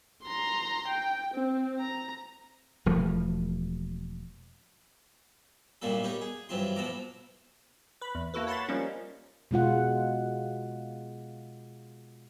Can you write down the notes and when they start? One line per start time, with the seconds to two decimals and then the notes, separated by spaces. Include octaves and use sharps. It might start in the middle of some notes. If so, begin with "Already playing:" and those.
0.24 A#5 C6
0.88 G5
1.34 C4
1.80 A#5
2.86 E1 F3 A3
5.82 F#2 A#2 D3 G3 A#3 A4
6.03 B3 D#4 G4 C#5
6.21 G#4
6.49 G2 E3 F#3 C4 F4 C6
6.76 B1 F3 B3 A4 A#5 D6
8.01 B4 B5
8.15 E2
8.34 A#3 E4 F#4 A4 B4
8.47 C#5 F#5 A5 B5 C6 A6
8.68 F3 G3 A#3 C#4 D#4
9.51 B2 G#3 F4 F#5